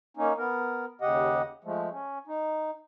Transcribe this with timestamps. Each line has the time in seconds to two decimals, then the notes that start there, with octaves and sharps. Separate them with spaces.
0.17 A#3 C#4 D#4
0.38 B3 A#4
1.01 D#2 C#3 G4 D#5 F#5
1.64 F3 G#3 A3
1.91 C#4
2.27 D#4